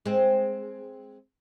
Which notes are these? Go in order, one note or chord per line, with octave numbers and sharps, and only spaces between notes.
G#3 C4